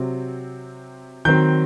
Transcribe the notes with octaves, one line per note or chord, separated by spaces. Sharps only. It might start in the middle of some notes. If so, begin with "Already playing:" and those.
Already playing: C3 F#3 C4
D#3 F#3 C4 G6